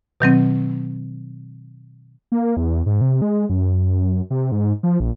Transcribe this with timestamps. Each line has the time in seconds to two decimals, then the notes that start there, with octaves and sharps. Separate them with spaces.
0.20 B2 D#3 F#3 C4
2.32 A#3
2.57 E2
2.86 G#2
3.01 C3
3.22 G#3
3.49 F#2
4.30 C3
4.52 G#2
4.83 F3
5.00 A#1